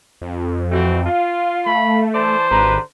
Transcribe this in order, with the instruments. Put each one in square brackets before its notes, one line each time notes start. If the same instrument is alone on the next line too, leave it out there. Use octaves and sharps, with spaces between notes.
[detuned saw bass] F2
[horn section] E3 A3 C4 [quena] F#4
[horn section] F4 [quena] F5
[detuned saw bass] A3 [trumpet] B5
[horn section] E3 D5 A5 [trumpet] C5
[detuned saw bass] G#1 [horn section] D3 G4 B4 [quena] A#5